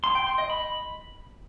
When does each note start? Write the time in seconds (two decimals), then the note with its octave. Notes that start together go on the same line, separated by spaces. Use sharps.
0.04 C6
0.15 G5
0.27 C6
0.38 D#5
0.50 B5